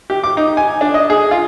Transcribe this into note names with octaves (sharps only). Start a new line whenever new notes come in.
G4
D6
D#4
G#5
D4
D#5
G#4
F4